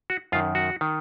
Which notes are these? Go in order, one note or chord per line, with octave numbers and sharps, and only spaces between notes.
F#4
F#2 D#3 F4
F#4
D#3